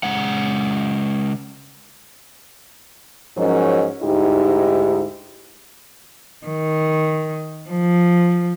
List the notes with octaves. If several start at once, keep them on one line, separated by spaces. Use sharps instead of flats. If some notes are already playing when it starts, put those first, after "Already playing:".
C#3 G#3 F#5
G#2 F3 F#3 C#4 A#4 D#5
D2 G#2 D#4 E4 G4
D#3
F3